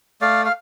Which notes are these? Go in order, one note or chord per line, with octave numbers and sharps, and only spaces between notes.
A3 D5 F5
F5